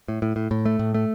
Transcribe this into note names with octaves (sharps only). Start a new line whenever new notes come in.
A2
A2
A2
A2
A3
A2
A3